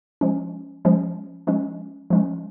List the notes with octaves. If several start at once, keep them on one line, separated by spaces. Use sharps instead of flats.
F3 G#3 C#4
F3 G#3 C#4
F3 G#3 C#4
F3 G#3 C#4